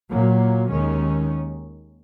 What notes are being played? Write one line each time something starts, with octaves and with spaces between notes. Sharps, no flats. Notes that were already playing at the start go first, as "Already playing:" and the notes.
A#2 F#3 A#3
D#2 D#3 G#3 C#4